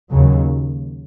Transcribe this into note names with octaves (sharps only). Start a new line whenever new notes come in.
D#2 C#3 F#3